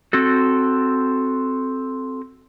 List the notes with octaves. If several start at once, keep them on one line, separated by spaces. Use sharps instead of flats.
C4 F#4 A4